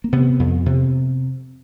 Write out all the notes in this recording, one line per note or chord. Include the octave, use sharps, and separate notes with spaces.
A#3
C3 B3
F2
C3